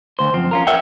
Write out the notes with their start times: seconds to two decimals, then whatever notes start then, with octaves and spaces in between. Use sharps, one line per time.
0.19 D2 C5
0.33 F#2 F3 C4
0.51 C#4 F4 A#4
0.67 A#4 C#5 E5 F#5 G5